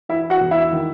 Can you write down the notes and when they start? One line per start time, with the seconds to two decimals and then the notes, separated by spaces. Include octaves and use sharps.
0.09 E3 E4 E5
0.30 F#4 F#5
0.41 E2
0.51 E4 E5
0.73 D#3